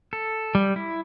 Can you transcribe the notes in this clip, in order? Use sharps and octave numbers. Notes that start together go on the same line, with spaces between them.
A4
G3
E4